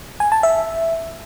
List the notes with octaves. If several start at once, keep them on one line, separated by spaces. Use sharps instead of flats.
G#5
A5
E5